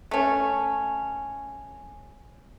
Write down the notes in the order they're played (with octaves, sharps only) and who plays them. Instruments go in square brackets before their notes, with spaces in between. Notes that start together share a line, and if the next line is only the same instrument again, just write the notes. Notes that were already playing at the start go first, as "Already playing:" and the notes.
[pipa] A3 C#4